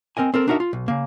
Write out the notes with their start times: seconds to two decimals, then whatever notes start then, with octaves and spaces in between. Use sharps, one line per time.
0.17 C4 A#4 D#5 G#5
0.34 C4 A4 A#4
0.48 D4 D#4 F#4 A#4 E5
0.60 F4
0.73 B1
0.88 C#3 A#3